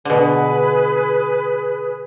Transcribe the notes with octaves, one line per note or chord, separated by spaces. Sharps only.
B2 D3 G#4 B4